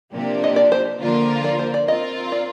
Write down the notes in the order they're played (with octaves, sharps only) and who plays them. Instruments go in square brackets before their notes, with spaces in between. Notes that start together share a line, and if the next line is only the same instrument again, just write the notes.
[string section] C3 F3 A#3 D4 G4
[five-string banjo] D#5
D5
C5
[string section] D3 F3 A#3 F4 A#4
[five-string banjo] D5
C5
D5
[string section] C4 F4 A#4 [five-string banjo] D#5
[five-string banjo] D5